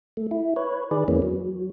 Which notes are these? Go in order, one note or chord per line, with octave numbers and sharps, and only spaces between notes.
A3
E4
B4 C#5
D#3 G#4 B4 D5
F2 E3 G#3 A#3 B3 C#4
F#3